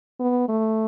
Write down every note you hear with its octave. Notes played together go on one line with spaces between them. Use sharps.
B3
A3